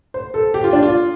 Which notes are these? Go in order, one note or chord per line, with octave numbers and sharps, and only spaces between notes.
C5
A4
G4
F4
D4
F4